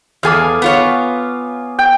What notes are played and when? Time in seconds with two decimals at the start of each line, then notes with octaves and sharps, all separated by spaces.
0.23 E2 G#4 A4 F5 G#5 D6
0.62 B3 F4 C#5
1.79 G5